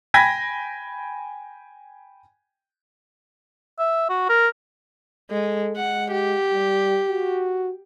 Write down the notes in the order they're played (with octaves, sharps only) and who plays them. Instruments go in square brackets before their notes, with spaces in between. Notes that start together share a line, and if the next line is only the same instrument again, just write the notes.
[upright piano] G5 G#5 B5 G#6 A#6 B6
[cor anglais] E5
F#4
A#4
[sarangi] G#3 [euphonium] A4
[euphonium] G#3 [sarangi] F#5
[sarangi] G4
[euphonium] G3
F#4